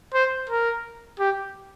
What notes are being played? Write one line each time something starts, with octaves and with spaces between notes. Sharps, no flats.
C5
A#4
G4